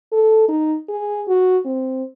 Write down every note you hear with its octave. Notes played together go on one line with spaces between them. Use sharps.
A4
D#4
G#4
F#4
C4